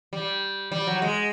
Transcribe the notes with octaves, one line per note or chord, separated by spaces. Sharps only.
G3
G3
F#3
G#3